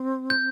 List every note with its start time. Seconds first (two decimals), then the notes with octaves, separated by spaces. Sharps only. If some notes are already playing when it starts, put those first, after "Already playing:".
Already playing: C4
0.30 G6